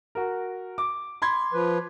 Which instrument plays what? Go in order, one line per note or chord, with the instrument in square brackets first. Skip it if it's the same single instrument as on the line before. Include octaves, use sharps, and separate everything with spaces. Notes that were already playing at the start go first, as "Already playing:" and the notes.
[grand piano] F#4 A#4
D6
B5 C6 G#6
[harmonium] F3 B4